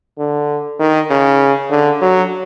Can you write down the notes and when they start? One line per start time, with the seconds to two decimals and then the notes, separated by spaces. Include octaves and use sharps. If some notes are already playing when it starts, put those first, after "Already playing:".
0.19 D3
0.80 D#3
1.10 C#3
1.71 D3
2.02 F#3